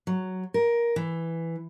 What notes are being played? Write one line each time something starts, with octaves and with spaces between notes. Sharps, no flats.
F#3
A#4
E3